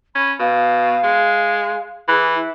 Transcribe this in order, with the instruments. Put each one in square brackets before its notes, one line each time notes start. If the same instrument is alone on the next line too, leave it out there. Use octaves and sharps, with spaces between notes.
[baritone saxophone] C#4 [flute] B5
[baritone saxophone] B2 [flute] F5
[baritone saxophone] G#3
[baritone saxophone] E3 [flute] G#4
[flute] E4